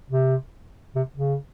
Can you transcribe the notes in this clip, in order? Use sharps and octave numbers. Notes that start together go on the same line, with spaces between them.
C3
C3
C#3